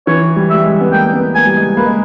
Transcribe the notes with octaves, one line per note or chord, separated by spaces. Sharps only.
E3 C#5
G3
G3 E5
G#3
B3
A#3 G5
B3
A#3 G#5
G3
G#3
A#3 B4
G#3